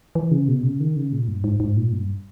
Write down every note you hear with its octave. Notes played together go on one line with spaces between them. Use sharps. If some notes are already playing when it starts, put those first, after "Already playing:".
E3
C#3
B2
C#3
D#3
C#3
A#2
G2
G#2
G#2
A#2
G2